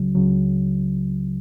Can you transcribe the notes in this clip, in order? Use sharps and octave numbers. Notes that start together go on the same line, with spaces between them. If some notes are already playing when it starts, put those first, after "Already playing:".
Already playing: C#2 C#3 F#3
C#2 C#3 F#3